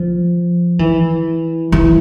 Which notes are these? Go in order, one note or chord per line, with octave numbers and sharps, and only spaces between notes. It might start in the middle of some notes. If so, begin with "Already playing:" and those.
Already playing: F3
E3
E3